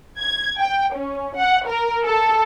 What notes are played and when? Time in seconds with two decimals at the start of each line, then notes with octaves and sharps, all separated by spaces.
0.20 G#6
0.59 G5
0.94 C#4
1.36 F#5
1.68 A#4
2.05 A4